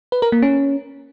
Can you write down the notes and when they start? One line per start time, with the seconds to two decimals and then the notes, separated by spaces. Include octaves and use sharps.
0.12 B4
0.22 A#4
0.32 A#3
0.42 C#4